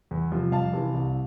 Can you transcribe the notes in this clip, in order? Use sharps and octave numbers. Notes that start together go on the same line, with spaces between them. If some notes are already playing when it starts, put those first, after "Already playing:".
E2
C3 F3
F2 F5 A5
C3 E3
C2